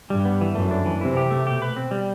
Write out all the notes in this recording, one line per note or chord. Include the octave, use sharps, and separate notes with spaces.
G2 G3
B3
E3
F#2 A3
D4
E3
C3 E4
G4
A3
B2 G4
B4
C4
G3